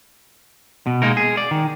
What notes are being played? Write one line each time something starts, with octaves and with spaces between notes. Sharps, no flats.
B2
G#3 A#3 D#4 A#4
G#4
D5
D#3